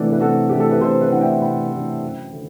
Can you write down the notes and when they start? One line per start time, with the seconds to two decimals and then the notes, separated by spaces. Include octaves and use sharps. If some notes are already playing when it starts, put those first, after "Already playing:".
Already playing: C3 E3 A3 D4 F#4
0.12 B4
0.20 C3 F#4 A4
0.49 E3 A3 D4 G4
0.60 A4
0.71 B4
0.81 C3 A4 C5
1.01 G4 B4
1.12 E3 A3 D4 F#5
1.21 E5 G5
1.41 C3 G5 B5
1.72 E3 A3 D4
2.02 F#2
2.33 D3